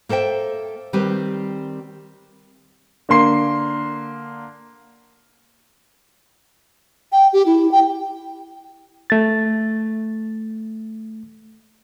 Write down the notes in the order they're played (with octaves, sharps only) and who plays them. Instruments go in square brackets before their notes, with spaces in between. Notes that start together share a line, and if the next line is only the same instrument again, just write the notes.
[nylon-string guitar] A#3 A4 C5 E5 G5
D#3 G3 C4 G4 B4
[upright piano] D3 A#3 C6 C7
[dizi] G5
G4
E4
G5
[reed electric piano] A3 A6